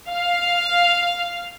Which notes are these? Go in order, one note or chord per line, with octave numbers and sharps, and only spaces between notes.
F5